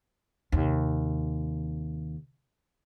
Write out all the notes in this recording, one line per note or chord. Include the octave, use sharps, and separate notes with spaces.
D#2 C3